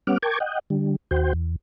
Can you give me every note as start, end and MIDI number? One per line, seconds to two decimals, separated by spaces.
0.07 0.18 55
0.07 0.18 59
0.07 0.18 61
0.07 0.18 78
0.07 0.18 86
0.07 0.18 89
0.23 0.39 70
0.23 0.39 79
0.23 0.39 81
0.23 0.39 85
0.23 0.39 86
0.23 0.39 92
0.40 0.59 75
0.40 0.59 78
0.40 0.59 79
0.70 0.96 50
0.70 0.96 55
1.11 1.33 39
1.11 1.33 66
1.11 1.33 72
1.11 1.33 79
1.33 1.56 40